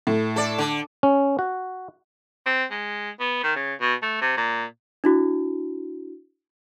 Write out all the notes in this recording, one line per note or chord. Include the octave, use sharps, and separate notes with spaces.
A2
A4 D5
D3
C#4
F#4
C4
G#3
B3
D#3
C#3
B2
A3
C3
A#2
D4 E4 F#4